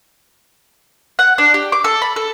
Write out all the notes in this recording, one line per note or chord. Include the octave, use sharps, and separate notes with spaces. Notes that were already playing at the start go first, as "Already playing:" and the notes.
F#5
D4
G4
D6
A4
B5
A4